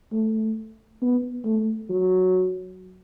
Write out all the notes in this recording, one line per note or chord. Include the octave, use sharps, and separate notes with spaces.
A3
B3
A3
F#3